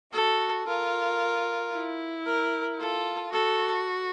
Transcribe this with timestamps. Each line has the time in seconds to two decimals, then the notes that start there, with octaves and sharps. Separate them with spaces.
0.13 F#4 A4
0.67 F4 A#4
1.73 E4
2.26 A#4
2.79 F4 A4
3.32 F#4 A4